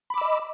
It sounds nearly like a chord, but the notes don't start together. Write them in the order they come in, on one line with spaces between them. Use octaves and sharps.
B5 D6 E6 D#5